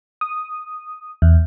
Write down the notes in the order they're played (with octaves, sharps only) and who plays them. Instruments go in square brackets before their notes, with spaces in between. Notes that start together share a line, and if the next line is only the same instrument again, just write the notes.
[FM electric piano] D#6
E2